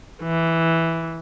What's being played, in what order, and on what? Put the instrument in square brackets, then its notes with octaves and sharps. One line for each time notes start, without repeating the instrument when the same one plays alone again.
[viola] E3